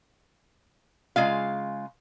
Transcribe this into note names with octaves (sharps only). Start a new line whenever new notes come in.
C#3 G#3 F4 F5